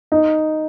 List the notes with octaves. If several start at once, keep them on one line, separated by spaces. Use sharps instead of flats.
D#4